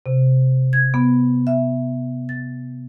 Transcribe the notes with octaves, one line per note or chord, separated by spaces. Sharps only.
C3
G#6
B3
E5
A6